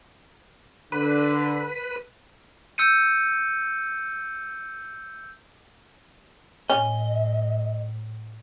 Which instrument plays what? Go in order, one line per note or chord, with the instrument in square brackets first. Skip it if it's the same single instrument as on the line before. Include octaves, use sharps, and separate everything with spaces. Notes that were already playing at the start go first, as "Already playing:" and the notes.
[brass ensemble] D3 [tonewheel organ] B4
[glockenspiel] E6 G6 C#7 D#7
[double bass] A2 [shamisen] C#4 [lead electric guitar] D#5